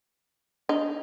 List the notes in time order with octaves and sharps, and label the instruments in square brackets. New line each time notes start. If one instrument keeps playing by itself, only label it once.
[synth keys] D4 [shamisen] D#4